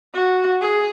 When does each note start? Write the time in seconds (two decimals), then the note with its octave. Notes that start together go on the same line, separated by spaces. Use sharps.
0.15 F#4
0.61 G#4